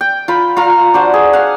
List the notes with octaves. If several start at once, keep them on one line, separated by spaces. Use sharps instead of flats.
G5
F4 B5
F4 F5 A#5
D4 F#4 C5
G#4
F5 F#5